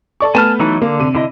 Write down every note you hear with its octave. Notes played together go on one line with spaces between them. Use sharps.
A4 D5 C#6
A3 B3 B4 G#5 A5 F6
E3 F#3 D#4
D3 A#3
C3 D#7
D3 E4 D#5